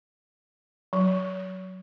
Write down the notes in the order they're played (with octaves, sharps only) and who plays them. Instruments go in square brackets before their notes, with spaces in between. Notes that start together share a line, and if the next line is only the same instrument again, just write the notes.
[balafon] F#3